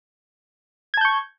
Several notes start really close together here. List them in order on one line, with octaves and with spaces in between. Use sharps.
G#6 A5 G6 C#6